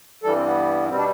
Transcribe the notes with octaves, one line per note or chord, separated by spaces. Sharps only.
G2 E3 G3 A4
C4
B3
B2 G3 C4
D4